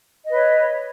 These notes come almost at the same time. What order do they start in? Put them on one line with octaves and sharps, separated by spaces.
D#5 B4 C#5